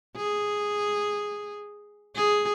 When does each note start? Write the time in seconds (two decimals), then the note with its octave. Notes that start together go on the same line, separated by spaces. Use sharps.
0.16 G#4
2.16 G#4